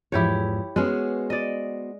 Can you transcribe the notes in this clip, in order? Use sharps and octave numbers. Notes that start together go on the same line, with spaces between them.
E2 G#2 F3 E4 G4 C#5
G#3 B3 C#4 F#4 C5
D5 D#5